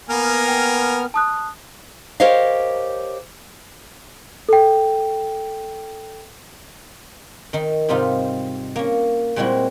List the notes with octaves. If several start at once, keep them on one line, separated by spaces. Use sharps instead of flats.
A#3 B3 A#4 G#5 F6
G5
A5 D#6 F#6
G4 A#4 C5 C#5 D#5 F5
A4 G5
D#3 D#4
G#2 C3 G3 D#4 F4 F5
A#3 C#4
A#2 G3 G#3 C4 E4 F#4